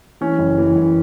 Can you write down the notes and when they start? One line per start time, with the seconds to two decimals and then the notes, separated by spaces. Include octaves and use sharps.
0.21 E3 C#4
0.39 F#1
0.58 E3
0.76 F#1